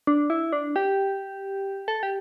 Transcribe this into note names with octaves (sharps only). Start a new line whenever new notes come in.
D4
E4
D4
G4
A4
G4